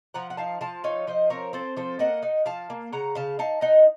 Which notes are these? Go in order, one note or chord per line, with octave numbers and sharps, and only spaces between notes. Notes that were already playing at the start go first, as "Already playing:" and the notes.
F3 F#5 A#5
F#5
D#4 F5 A5
F3 F5 A5
D#4 C#5 F5
F3 C5 D#5
C4 A#4 C#5
C4 A4 C5
F3 A4 C5
A#3 D#5 F#5
D#4
F3 F5 A5
A#3
C#3 F#5 A#5
C#3 F5 A5
D#4 F5 A5
D#4 D#5 F#5